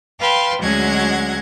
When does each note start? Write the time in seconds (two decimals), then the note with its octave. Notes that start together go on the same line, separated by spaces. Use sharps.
0.19 B4 F5 G5 A5 C6
0.60 D2 F#3 G#3 C#4 F#5 G#6